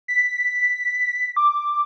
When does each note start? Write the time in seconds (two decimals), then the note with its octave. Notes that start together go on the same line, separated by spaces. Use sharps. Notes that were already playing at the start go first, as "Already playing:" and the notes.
0.08 B6
1.36 D6